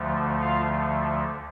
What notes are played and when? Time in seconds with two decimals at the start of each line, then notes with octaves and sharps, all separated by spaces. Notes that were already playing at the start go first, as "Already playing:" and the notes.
Already playing: D2 D3 F3 A3
0.40 F4 F5